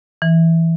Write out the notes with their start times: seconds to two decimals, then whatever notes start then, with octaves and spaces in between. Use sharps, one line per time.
0.22 E3